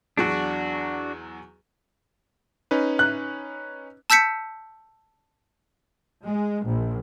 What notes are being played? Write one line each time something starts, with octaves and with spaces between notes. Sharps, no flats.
E2 F#3 D4 F#4 G#4
C#4 D#4 B4
F#6
A5 E6 G6 B6 C#7
G#3
A#1